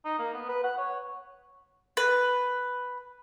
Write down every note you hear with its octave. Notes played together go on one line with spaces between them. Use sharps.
D#4
A#3
B3
B4
F#5
C#5
B4